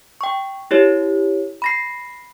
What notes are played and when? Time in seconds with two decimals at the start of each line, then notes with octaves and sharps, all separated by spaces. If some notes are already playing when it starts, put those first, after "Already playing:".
0.21 G5 C#6
0.71 E4 G4 C#5
1.62 B5 A#6 C7